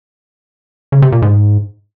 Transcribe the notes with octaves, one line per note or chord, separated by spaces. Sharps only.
C#3
C3
A#2
G#2